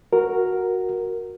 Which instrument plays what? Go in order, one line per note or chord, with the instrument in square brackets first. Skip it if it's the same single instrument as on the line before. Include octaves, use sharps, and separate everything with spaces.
[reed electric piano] F#4 A#4